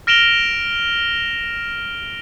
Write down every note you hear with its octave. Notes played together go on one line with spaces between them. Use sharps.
F6 A#6 D7 E7 F7 G7